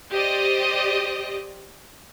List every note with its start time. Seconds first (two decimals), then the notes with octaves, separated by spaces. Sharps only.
0.11 G4 C5 D5 D#5